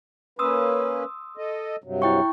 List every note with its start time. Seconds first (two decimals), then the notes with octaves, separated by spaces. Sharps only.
0.39 A#3 C#4 B4 C6 D#6 E6
1.37 A4 D#5
1.84 G2 C3 F#3
2.02 E4 G5 C#6